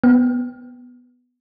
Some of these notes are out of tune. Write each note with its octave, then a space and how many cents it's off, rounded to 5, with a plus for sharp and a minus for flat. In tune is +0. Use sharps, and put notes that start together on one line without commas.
B3 +0 G5 +0